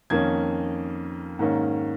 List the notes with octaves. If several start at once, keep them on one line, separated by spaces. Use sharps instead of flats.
F2 D#3 A#3 C#4 G#6
G#2 D#3 A#3 C#4